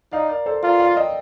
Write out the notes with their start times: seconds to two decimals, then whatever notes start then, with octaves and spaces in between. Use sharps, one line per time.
0.12 D#4 D5 F5
0.29 A#4 D5
0.46 A4 C5
0.63 F4 A#4 D5
0.80 D5 F5
0.97 D#5 G5